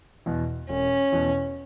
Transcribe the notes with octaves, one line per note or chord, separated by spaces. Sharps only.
E2 B2
E1 C#4
E2 B2